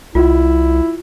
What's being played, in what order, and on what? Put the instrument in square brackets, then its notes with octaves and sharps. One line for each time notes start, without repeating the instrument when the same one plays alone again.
[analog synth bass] C2 [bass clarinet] E4 [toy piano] F4